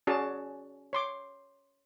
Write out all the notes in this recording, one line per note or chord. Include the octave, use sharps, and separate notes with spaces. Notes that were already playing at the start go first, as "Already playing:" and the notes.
C#4 F#4 G#4 D5 A5
C#5 C6 D6